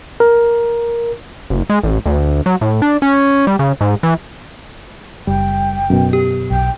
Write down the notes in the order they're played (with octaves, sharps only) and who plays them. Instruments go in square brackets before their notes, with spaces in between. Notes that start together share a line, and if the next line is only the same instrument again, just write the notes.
[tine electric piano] A#4
[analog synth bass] F#1
G#3
A1
D2
F#3
A2
D4
C#4
G3
C#3
G#2
E3
[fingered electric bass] F#1 [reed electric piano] G3 [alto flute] G5
[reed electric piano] F#2 B2
[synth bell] G4
[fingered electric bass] B1 [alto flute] G5